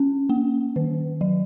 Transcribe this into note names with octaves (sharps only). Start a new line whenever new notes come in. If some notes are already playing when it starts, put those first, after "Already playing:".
Already playing: C#4
A#3
D#3
F#3